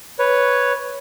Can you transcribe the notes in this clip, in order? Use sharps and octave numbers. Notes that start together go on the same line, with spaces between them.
B4 C#5